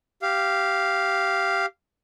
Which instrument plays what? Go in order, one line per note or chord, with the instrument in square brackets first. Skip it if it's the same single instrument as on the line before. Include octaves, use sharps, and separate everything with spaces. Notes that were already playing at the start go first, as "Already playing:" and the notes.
[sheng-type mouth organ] G4 F5